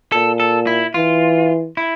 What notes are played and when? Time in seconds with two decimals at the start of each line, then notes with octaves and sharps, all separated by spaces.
0.12 A#2 A4
0.40 A4
0.67 E4
0.94 E3 F4
1.77 E4